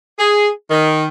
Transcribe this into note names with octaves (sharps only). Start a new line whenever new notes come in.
G#4
D#3